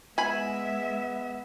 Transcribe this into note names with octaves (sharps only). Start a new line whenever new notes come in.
G#3 B3 E5 G#5 B5